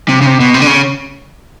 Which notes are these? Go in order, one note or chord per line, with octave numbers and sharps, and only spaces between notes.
C3
C#3
C3
B2
C3
D3
C#3